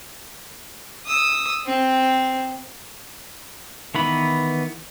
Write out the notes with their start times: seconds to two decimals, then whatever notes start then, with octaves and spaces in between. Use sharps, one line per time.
1.06 D#6 E6
1.66 C4
3.95 D#3 E3 B3 B5